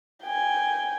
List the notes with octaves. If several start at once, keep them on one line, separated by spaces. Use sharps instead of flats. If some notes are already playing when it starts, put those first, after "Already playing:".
G5 G#5